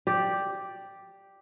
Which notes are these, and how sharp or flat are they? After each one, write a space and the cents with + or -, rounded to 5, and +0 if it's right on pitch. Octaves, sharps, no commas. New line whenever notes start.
G4 +0 D5 +0